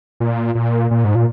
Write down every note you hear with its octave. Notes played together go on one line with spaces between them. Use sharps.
A#2
A#2
A#2
G#2
A#2